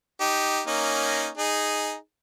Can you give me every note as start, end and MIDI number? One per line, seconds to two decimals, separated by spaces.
0.21 0.61 63
0.21 0.61 67
0.67 1.29 58
0.67 1.29 61
0.67 1.29 63
1.38 1.95 63
1.38 1.95 68